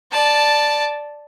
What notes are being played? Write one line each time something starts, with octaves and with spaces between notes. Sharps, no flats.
D5 A5